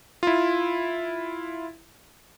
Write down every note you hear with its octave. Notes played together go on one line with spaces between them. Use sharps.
E4 F4